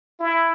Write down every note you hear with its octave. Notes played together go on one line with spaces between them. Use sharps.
E4